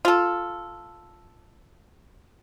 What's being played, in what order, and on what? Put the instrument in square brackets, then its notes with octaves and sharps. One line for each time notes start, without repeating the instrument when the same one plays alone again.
[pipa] F4 A4